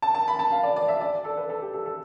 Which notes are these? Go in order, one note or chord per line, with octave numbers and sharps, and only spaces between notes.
A5
A5
B5
A5
F5
D5
D5
E5
D5
A4
B4
A4
G4
A4
A4